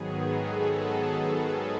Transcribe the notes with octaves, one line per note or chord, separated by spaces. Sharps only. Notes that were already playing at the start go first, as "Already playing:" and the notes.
Already playing: G#2 D#3 F#3 B3 G#4
G#4
A4